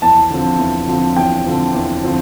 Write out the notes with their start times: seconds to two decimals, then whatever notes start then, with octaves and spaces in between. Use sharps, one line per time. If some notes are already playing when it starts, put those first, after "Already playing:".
0.02 E2 A5
0.30 D3 F3 C4
0.59 E2
0.87 D3 F3 C4
1.16 E2 G5
1.46 D3 F3 C4
1.74 E2
2.03 D3 F3 C4